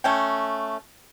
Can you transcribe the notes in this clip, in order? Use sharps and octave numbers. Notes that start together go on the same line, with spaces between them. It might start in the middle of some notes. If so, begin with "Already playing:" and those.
A3 C#4 G5